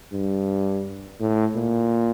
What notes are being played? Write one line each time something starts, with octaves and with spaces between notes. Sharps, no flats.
G2
A2
A#2